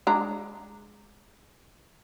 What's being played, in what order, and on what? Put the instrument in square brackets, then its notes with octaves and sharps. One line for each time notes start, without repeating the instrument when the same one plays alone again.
[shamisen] G#3 D4 A#5